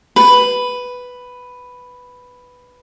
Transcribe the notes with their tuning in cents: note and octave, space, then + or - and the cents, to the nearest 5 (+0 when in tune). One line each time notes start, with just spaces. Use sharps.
B4 +5